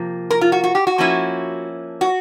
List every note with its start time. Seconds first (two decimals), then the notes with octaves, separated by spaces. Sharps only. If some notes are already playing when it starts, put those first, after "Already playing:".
Already playing: C3 F3 A#3
0.31 A#4
0.41 F4
0.52 F#4
0.64 F#4
0.75 G4
0.87 F#4
0.98 F3 A#3 C#4 E4
2.01 F#4